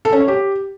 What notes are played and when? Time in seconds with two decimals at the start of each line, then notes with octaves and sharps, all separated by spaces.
0.05 A4
0.13 C#4
0.20 C#5
0.28 G4